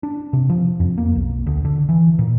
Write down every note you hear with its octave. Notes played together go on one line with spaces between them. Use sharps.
D4
C3
F3
F2
A#3
B1
D2
D3
E3
A#2